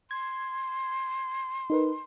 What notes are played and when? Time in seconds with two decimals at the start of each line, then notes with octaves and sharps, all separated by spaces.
0.11 C6 G#6
1.70 D#4 A#4 B4